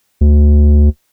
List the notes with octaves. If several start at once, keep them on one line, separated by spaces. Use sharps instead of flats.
D2